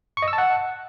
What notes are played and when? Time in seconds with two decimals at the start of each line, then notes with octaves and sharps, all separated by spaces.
0.17 C#6
0.22 D#5
0.28 E6
0.33 A5
0.38 F#5